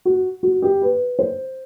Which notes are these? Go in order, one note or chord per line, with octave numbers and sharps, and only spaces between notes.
F#4
F#4
G4
B4
C5